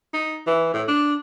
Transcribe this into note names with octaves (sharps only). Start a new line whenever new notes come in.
D#4
E3
A2
D4